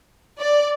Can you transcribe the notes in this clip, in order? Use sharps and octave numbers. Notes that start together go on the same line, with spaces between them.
D5